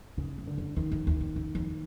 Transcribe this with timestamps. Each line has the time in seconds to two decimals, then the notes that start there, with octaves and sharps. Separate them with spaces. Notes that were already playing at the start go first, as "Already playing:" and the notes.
0.17 F#2 C#3
0.38 G2
0.47 D3
0.58 F#2
0.76 F2 D#3
0.92 F2
1.07 E2
1.21 F2
1.36 F#2
1.55 F2